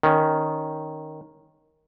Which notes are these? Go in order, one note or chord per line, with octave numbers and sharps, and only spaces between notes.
D#3 C#4